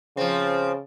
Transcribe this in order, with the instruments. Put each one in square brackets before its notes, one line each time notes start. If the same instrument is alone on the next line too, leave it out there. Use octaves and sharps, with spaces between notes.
[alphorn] C#3 [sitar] F3 C4